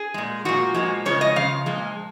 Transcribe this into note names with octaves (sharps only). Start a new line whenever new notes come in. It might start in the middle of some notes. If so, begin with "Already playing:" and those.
Already playing: G#4
A#2 G#3
A#2 F3 G#3 F#4
A#2 F3 G#3
C#3 F3 G#3 C#5
D#5
C#3 F3 F5
A#2 F3 G#3